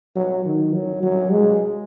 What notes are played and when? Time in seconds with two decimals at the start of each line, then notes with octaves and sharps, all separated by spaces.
0.16 F#3
0.45 D#3
0.73 F#3
1.03 F#3
1.31 G#3